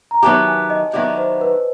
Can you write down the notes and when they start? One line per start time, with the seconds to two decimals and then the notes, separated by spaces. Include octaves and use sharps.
0.11 A#5
0.23 D#3 F#3 B3 E4 G4 A5
0.47 G#5
0.70 D#5
0.93 D#3 F#3 B3 E4 G4 D5
1.17 C5
1.41 B4